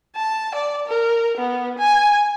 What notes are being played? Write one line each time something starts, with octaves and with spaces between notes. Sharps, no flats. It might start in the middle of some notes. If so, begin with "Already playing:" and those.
A5
D5
A#4
B3
G#5